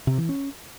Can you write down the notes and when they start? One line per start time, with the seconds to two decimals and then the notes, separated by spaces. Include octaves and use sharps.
0.07 C3
0.18 E3
0.29 C#4